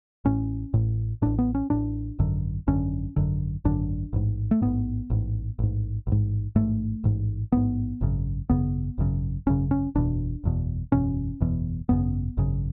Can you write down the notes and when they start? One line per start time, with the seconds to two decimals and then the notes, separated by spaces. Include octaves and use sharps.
0.25 A1 A2 C#4
0.74 A1 A2
1.22 A1 A2 D4
1.39 B3
1.55 C#4
1.70 A1 A2 D4
2.19 G#1 F#2 D3
2.67 G#1 F#2 D3 C#4
3.16 G#1 F#2 D3
3.65 G#1 F#2 D3 D4
4.13 A1 G#2
4.51 A3
4.62 A1 G#2 B3
5.10 A1 G#2
5.59 A1 G#2
6.07 A1 G#2
6.56 A1 G#2 A3
7.04 A1 G#2
7.52 A1 G#2 B3
8.01 G#1 F#2 C#3
8.50 G#1 F#2 C#3 B3
8.98 G#1 F#2 C#3
9.47 G#1 F#2 C#3 C#4
9.71 C#4
9.95 F#1 E2 B2 D4
10.44 F#1 E2 B2
10.92 F#1 E2 B2 C#4
11.41 F#1 E2 B2
11.89 G#1 F#2 C#3 B3
12.37 G#1 F#2 C#3